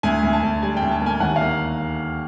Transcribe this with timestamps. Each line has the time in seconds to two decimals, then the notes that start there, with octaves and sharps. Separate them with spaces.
0.03 D2 G#5
0.23 D2
0.33 A5
0.43 D2
0.62 G3 G#5
0.77 G5
0.82 D2
0.91 A5
1.02 A#3 G#5
1.20 D#2 F#5
1.36 F5
1.41 A#3